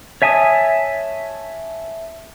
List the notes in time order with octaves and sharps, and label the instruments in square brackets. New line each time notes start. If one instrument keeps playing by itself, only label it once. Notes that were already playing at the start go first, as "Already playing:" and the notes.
[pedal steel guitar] C#5 E5 G#5 A5 D#6